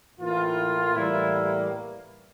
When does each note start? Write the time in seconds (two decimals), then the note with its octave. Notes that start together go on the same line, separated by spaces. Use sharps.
0.20 A2 E3 A#3 F4
0.94 A2 E3 G3 A#3 E4